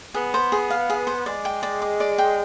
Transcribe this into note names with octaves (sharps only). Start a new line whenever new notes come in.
B3 G#4
C5
G#4
F5
G#4
C5
G#3 D5
G5
D5
D6
D5
G5